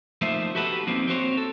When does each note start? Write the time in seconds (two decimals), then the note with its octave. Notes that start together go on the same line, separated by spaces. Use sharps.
0.22 F3 A3 A#3 D#4 C5 E5
0.55 F#4 G4 A4 B4 F#5
0.87 F3 A#3 C4 D#4
1.07 C4 F#4 C5 C#5
1.37 A4